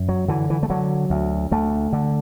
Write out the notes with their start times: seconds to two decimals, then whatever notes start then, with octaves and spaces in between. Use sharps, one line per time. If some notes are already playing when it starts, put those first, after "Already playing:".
Already playing: F#2
0.09 F#3
0.28 D3 E3
0.50 E3
0.63 A3
0.70 D3 F#3
1.10 D2
1.51 D2 A3
1.93 D3